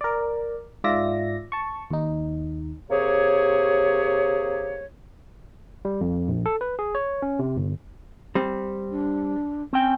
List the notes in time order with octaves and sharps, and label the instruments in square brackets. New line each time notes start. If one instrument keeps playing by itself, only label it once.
[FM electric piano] A#4 D5
G#2 F4 D5 E5 A#6
A5 C#6
D#2 D#4
[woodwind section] C3 A#3 G4 G#4 C#5
[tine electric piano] G3
F2
A#1
A4
B4
G#4
C#5
C#4
C3
G1
[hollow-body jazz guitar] G3 C4
[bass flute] D4
[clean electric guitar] C4 G5 [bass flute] C#4